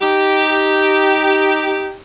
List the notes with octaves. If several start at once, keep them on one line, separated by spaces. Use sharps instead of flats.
D#4 G4